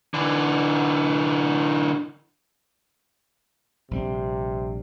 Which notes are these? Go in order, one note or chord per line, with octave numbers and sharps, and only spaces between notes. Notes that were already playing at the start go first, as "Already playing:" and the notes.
D3 E3
A#1 C3 G3 C4